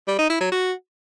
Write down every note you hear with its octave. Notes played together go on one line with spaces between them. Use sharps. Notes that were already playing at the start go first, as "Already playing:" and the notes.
G3
D#4
E4
F#3
F#4